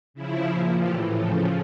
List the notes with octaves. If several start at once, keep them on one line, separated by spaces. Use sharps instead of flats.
C#3 F3 E4
A#2 F3
A2 E3 G4
C#3 F3 A4